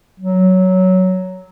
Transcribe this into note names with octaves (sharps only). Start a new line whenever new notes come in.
F#3